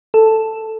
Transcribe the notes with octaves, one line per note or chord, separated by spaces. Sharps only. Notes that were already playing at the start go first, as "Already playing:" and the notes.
A4